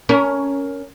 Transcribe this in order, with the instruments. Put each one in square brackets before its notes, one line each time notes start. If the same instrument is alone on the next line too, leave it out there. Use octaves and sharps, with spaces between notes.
[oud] C#4 A#4